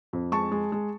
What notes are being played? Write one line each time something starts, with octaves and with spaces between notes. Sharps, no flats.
F2
G#3 A5 C#6
G#3
G#3